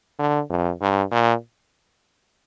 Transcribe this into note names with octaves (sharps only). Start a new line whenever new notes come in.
D3
F2
G2
A#2